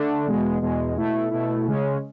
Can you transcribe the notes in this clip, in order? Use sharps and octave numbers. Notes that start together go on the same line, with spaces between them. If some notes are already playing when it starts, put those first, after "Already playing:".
Already playing: D3 A3 D4
E2 B2 G#3
E2 B2 G#3
B2 A3 E4
B2 A3 E4
C#3 G#3 C#4